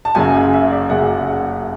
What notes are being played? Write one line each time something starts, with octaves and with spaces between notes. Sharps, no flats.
A5
F#1 F#2 C#3 G#5
G#5
E5
D5
F#1 F#2 C#3 F#5
F#5